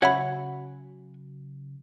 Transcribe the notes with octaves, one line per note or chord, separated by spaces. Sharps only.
C#3 F#3 F#4 C#5 E5 F#5 G#5 B5